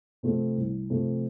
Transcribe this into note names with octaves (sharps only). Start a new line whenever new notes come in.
C3 F3 A3 C4
C2
C3 F3 A3 C4